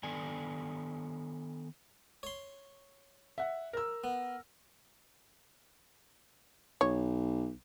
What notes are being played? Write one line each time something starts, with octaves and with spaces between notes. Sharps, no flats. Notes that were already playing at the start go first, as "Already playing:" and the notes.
D#3 B3 D4 A4 D5 G#5
C#5 C6
E5 F#5
A#4 E6
B3
B1 C#5